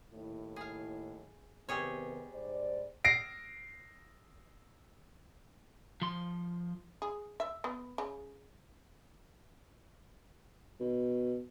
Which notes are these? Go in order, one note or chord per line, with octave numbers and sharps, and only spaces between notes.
D#2 A2 E4
G#4 F5
C3 D#3 G3 B3 G#4 C#5
G#2 C5 D5
A#6 C7 D7
F3 C6
G#4
E5
B3
C#3
B2